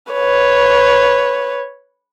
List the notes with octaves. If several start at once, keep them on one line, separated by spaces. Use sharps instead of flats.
B4 C#5